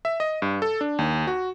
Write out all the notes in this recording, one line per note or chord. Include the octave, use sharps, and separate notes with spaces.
E5
D#5
G2
A4
D4
D#2
F#4